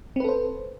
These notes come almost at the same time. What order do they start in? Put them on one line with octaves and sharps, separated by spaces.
C4 B4 A4 C5